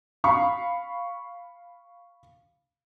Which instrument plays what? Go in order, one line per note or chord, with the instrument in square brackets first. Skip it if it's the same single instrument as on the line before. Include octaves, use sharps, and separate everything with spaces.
[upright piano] F5 B5 C#6